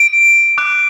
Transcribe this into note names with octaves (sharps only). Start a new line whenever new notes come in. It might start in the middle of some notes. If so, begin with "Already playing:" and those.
Already playing: D7
D6 F#6